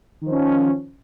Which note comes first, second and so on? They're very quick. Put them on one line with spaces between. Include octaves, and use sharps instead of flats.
D#3 F3 C#4